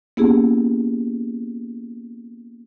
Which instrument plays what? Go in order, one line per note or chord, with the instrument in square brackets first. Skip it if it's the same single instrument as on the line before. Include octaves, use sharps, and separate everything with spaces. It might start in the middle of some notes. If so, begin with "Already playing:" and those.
[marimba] A#3 B3 C#4 E4 G4 G#4